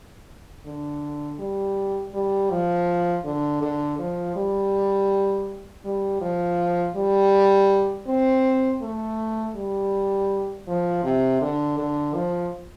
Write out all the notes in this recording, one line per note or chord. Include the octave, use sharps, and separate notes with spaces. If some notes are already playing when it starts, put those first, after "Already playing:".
D3
G3
G3
F3
D3
D3
F3
G3
G3
F3
G3
C4
A3
G3
F3
C3
D3
D3
F3